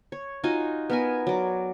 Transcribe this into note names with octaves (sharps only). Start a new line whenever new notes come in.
C#5
D#4 F4 F#4 G#5
B3 A#4 G#5
F#3 D5